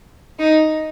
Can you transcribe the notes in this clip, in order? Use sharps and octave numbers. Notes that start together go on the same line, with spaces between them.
D#4